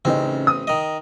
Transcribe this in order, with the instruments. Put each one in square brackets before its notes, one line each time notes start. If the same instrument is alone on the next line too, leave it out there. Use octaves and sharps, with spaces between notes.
[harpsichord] A1 C4 [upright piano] C#3 D#4
[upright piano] D#6
[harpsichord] D#3 D#5